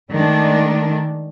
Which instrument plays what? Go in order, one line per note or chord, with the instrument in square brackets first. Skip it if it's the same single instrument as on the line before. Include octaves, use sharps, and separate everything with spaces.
[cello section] D#3 G#3 A3 D4